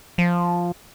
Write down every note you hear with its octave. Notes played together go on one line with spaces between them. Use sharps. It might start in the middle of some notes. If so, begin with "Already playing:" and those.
F3